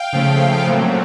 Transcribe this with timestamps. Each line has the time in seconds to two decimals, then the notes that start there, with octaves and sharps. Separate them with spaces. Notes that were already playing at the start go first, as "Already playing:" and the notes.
Already playing: F5 G5
0.13 C#3 F3 A3
0.67 A#2 F#3 A3 C4